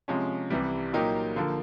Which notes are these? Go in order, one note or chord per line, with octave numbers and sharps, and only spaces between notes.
C3 F3 G#3 C#4
C2 C3 E3 G3
A#2 F#3 A#3 D#4 G4
D3 F3 A#3